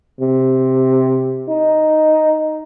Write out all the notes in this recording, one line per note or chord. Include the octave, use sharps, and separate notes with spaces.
C3
D#4